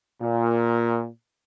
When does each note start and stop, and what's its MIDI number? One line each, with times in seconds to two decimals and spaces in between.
0.20 1.07 46